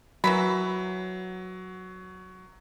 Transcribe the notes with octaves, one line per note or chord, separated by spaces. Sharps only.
E3 F#3 A#4 B5